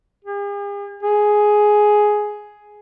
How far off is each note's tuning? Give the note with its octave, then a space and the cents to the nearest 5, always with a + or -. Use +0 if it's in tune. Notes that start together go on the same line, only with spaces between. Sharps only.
G#4 -45
G#4 +10